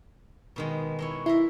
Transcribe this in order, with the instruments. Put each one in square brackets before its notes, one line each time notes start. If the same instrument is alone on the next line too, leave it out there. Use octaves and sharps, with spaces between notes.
[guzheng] B2 D#3 G#3
G#3 E4 C#5
[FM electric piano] E4 [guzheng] E5 A#5 C6